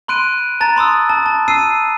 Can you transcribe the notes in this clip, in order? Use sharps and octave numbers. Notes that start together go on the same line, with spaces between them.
B5 C6 F#6 D7 D#7
A5 A#5 A6
B5 C6 D#6 E6
A5
A5
E6 C7 D#7